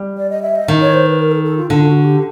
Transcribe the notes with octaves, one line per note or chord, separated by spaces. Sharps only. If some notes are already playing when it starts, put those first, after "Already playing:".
Already playing: G3
D5
D#5
E5
D#5
D#3
C#5
C5
B4
A#4
A4
A4
F4
D3 F4
F#4
G4